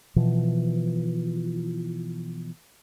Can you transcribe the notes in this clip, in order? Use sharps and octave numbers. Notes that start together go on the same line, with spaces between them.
B2 E3 F3